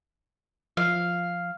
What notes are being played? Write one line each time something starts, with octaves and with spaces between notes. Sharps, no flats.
F3 F5